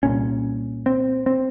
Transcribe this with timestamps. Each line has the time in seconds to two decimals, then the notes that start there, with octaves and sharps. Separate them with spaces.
0.03 C2 A#2 C#4
0.86 C4
1.26 C4